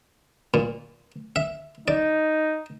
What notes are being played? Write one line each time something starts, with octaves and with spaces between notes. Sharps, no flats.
A#2
E5
D#4 D5